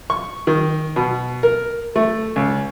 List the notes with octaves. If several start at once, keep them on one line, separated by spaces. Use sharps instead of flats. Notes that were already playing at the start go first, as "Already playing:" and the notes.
C#6
D#3
B2
A#4
A3
C#2